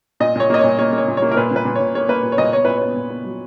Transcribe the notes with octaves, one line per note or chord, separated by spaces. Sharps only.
A#2 D#5
A#2 C#5
A#3 D#5
A#2 C#5
A#3 C#5
A#3
C#5
A#2
C#5
A#3
A#4
A#2 B4
A#2 B4
A#2
A#2 C#5
A#3 C#5
A#3 B4
A#2
C#5
A#2 D#5
B3 C#5
A#2 B4
B3 C#5
A#2
B3
F#3